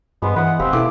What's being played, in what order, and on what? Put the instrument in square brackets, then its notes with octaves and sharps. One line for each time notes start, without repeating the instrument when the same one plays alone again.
[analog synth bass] G2 [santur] G#3 B4 C5 [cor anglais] B3
[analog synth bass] E3 [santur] B4 D#6 [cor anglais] F#5
[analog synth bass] F1 [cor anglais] C4 [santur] G4 B4 F5
[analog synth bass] B2 [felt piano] E4 A4 D6 [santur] G#4